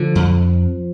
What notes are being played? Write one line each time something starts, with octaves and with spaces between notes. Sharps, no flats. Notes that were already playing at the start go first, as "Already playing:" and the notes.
Already playing: D3 F3
F2